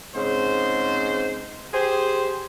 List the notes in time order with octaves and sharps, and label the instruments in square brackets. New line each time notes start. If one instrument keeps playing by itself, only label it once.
[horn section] G#2 C#3 C4 C5
G4 G#4 C5